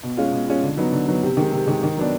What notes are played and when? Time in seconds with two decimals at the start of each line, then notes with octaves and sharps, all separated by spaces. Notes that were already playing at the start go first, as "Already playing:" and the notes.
0.03 B2
0.17 G#3 C#4 F4
0.32 B2
0.48 G#3 C#4 F4
0.63 D3
0.77 F#3 B3 D#4
0.92 D3
1.08 F#3 B3 D#4
1.23 C3
1.37 D#3 G#3
1.52 C3
1.67 D#3 G#3
1.83 D#3
1.97 F#3 B3 D4